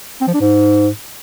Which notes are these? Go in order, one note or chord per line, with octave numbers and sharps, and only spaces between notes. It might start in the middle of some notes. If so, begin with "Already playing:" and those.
C4
F3
D4
G#2